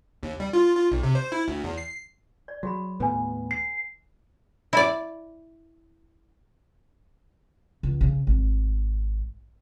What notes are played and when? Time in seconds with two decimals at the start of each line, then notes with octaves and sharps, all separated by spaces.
0.23 D#2
0.40 G3
0.53 F4
0.77 F4
0.92 B1
1.03 C3
1.15 C5
1.32 E4
1.48 D2
1.64 E2
1.78 C7
2.48 D5
2.63 F#3 F#4 G#4 B5
3.00 D#2 A2 B3 B4 G#5
3.51 C7
4.73 E4 D5
7.83 C#2
8.01 C#3
8.27 G#1